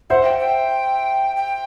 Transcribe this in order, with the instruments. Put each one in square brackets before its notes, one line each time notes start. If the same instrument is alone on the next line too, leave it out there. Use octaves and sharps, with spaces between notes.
[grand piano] C5 E5 [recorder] F#5
[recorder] G5
G5
G5